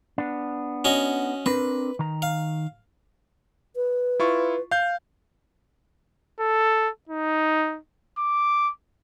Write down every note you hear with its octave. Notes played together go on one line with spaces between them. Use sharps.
B3 D4
C#4 F#4 D#5
C4 D4 A#4 B4
D#3 A#5
F5
B4
E4 F4 C#6
F5 G6
A4
D#4
D6